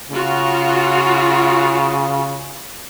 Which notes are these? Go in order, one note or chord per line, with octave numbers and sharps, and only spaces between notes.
C#3 F4 F#4